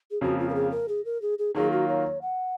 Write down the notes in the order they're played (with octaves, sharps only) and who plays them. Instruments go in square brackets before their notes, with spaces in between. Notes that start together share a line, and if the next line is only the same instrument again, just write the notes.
[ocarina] G#4
[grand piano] F2 C#3 F3 A#3 [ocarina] F#4
[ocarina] F4
A#4
G#4
A#4
G#4
A#4
G#4
G#4
[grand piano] D#3 F#3 A#3 F4 [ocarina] G#4
[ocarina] F#4
C#5
F#5